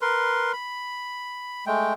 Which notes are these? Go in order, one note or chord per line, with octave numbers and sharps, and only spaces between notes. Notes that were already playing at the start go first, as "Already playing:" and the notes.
A#4 B4 C6
B5
G#3 A3 G5